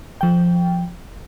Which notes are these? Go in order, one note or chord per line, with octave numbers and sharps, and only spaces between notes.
F3 G5